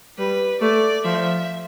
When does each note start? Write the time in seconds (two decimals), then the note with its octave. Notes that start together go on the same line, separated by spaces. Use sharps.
0.18 G3 B4
0.61 A3 D5
1.05 F3 E5